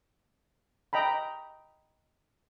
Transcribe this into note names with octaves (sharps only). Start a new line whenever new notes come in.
D#5 G5 A#5 B5